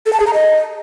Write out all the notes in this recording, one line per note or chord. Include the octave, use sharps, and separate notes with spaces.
A4
A5
G#4
A#5
D#5